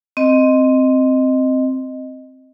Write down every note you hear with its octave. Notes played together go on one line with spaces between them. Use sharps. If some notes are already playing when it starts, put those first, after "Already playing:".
C4 D#5